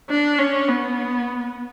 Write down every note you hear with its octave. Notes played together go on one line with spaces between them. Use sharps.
D4
C#4
B3